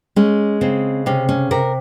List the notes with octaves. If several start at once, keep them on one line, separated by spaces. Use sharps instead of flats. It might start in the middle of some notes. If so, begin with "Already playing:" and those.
G#3 C#4
C#3 C4
C3 C#4
C#4
C3 A#4